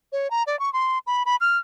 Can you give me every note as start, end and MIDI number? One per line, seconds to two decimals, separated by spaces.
0.12 0.30 73
0.30 0.43 82
0.47 0.59 74
0.59 0.72 85
0.73 0.98 84
1.07 1.23 83
1.26 1.36 83
1.41 1.58 89